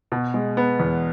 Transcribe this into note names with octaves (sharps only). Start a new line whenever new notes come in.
B2
G#3
B3
E2